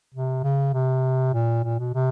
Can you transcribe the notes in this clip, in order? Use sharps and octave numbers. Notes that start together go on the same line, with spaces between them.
C3
C#3
C3
A#2
A#2
B2
C3